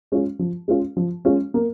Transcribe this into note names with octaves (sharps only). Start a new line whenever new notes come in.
G#3 C#4 F4
F3
G#3 C#4 F4
F3
G#3 C#4 F4
A#3